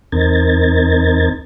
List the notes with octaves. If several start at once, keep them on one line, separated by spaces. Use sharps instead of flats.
E2 C4 D#4 A#4 G#6 A6